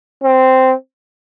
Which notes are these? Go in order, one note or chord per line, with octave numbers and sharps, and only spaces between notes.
C4